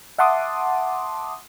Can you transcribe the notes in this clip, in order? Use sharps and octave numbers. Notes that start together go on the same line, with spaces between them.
E5 F#5 A5 C6 D6 D#6